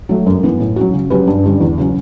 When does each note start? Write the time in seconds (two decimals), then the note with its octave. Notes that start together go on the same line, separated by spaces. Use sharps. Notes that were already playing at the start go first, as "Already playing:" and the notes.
0.09 F#3 A3
0.26 F#2
0.43 E3 B3
0.60 A2
0.76 F#3 C#4 F#4
0.94 C#3
1.10 F#3 C#4 G4 B4
1.27 G2
1.44 D3 G3 C#4
1.60 E2
1.78 C#3 F#3 C#4